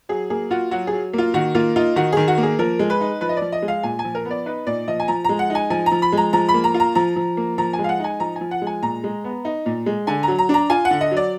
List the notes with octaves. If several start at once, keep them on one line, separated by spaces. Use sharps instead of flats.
F#3 G#4
A#3 G#4
F4 F#4
F#3 F#4
G#4
F#3
A#3 F4
D#3 F#4
A#3 F4
D#4 F4
D#3 F#4
D#3 G#4
F#4
A#3
G#4
F3 A#4
G#3
B4
D#4
F3 B4
D#5
F3 D5
D#5
G#3
F5
A#2 G#5
G#5
F3
A#4
B3
D5
D#4 B4
A#2 D5
F3 D#5
G#5
F3 A#5
G#3 A#5
F#5
D#4
G#5
F3 G#5
A#5
F3
B5
G#3
A#5
F3 A#5
B5
A#3
A#5
F4
A#5
F3 A#5
F3
A#3
F3 A#5
G#5
G#3
F5
F#5
D#4 G#5
F3 A#5
G#5
F3
F#5
G#3
G#5
A#2 A#5
G#3
B3
D#4
A#2
G#3
D3 G#5
F#3 A#5
A#5
D4 A#5
F4 G#5
F#5
D3
D#5
F#3
D5